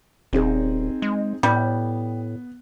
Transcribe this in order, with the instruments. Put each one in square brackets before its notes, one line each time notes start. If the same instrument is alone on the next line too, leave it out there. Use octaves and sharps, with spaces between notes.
[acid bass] D#1 [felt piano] C4 D#4 G#4
[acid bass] G#3
[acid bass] A2 [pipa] G3 [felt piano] B3